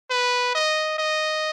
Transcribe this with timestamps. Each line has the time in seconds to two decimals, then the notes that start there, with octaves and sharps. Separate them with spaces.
0.10 B4
0.55 D#5
0.98 D#5